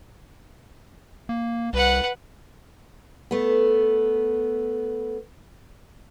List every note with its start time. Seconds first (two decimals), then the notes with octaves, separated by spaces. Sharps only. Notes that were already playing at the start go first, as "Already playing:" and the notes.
1.29 A#3
1.73 C2 B4 F#5
3.31 A3 B3